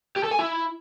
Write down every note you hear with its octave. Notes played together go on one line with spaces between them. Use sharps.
G4
A4
G#5
E4